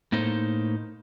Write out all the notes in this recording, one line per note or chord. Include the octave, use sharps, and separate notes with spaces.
A2 A#3 D#4 A4 C5